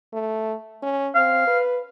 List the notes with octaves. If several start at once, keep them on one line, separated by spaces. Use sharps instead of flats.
A3
C#4
C4 F5
B4